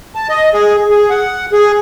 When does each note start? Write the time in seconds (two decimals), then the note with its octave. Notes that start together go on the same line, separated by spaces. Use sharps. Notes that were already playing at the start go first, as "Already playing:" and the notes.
0.15 A5
0.29 D#5
0.54 G#4
0.90 G#4
1.10 F#5
1.52 G#4